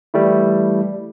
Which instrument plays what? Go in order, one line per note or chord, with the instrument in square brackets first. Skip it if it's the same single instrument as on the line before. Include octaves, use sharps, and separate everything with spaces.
[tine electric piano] E3 G3 A3 E4